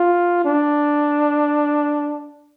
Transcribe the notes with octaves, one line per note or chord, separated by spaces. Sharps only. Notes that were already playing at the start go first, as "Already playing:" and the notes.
Already playing: F4
D4